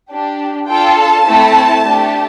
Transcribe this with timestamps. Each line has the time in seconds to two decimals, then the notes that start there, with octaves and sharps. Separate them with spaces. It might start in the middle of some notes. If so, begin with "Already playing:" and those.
0.11 D4 G4
0.69 D4 F4 A4 G5
0.98 A5
1.26 A3 C4 E4 A4
1.84 A3 D4 G4